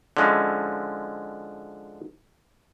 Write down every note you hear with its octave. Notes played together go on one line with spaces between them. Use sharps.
D3 F3 G#3 C#4 E4